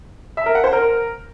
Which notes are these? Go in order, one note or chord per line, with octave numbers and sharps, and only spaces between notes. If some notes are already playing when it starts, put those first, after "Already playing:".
E5
A#4
F#5
C5
A#4